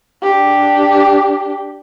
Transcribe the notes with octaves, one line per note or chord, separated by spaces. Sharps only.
D4 G4